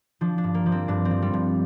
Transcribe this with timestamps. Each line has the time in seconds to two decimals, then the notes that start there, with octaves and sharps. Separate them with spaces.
0.21 F3 D4
0.38 D4
0.44 G2
0.54 A#3
0.66 F3
0.72 C4
0.88 G2 D4
1.05 C4
1.11 F3
1.22 G3
1.34 G2